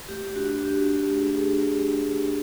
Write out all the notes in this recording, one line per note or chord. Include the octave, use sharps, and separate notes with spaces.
A3 G4
D4 F#4
F#4 G4
A3
D4 G#4